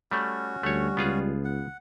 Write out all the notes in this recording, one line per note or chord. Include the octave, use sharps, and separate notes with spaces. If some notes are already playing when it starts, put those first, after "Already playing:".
G3 A3 C#4 F#4
D2 G3 A3 C#5
C#2 B3 F4 G#4
F#5